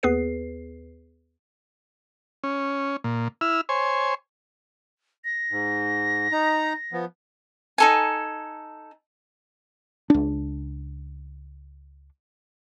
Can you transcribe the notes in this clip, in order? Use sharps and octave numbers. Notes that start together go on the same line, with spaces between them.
D#2 B3 G#4 B4 C7
C#4
A#2
E4 E6 F6
C5 C#5 G#5
A#6
G#2
D#4 A#5
F3 B3
D#4 A4 G#5
C#2 D4